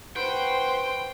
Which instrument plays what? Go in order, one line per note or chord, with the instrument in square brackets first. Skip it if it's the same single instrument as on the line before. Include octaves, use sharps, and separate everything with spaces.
[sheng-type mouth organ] B4 F#5 C#6 [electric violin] C5 C6 [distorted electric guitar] G5